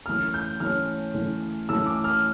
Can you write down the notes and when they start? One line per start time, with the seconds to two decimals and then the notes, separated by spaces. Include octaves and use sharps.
0.06 E3 A3 C#4 F6
0.34 G6
0.60 E3 A3 C#4 F6
1.14 E3 A3 C#4
1.69 E3 A3 C#4 E6
1.86 D6
2.04 F6